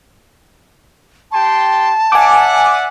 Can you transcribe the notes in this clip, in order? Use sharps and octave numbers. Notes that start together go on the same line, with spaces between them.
G4 G5 A5 C6
D5 E5 F#5 G#5 D6